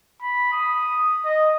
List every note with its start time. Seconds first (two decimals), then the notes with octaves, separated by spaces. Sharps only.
0.22 B5
0.53 D#6
1.25 D#5